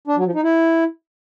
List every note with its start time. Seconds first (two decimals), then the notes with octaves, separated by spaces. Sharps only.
0.07 D4
0.16 F#3
0.25 F3
0.35 D#4
0.44 E4